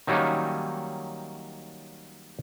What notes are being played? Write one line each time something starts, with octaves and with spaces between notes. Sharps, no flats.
D#3 F#3 G3 A#3 C#4 D#4